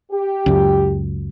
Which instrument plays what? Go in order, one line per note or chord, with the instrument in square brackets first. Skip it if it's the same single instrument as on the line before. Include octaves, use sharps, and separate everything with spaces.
[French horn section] G4
[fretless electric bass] C#2 F#2